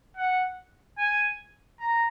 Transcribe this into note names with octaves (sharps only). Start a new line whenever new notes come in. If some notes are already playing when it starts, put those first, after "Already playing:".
F#5
G#5
A#5